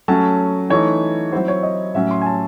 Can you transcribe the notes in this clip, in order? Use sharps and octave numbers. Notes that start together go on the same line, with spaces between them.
F#3 A3 C#4 A5
E3 A3 D#4 C#5
F#3 C4 E4 C5
C#5
D#5
A2 F#3 C#4 E5
C6
G#5
A5